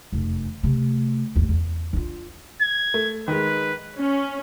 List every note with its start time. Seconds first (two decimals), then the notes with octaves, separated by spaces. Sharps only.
0.12 F1 E2
0.63 C3 A3
1.36 A1 D#2
1.49 E2
1.93 D4 F4
2.61 G#6
2.94 A3
3.28 D#3 G#3 B4
3.97 C#4